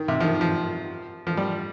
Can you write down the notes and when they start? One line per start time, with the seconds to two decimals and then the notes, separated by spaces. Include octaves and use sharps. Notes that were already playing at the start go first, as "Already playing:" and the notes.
Already playing: D#3
0.08 C3
0.20 F3
0.24 D#3
0.41 F3
1.27 F3
1.37 G3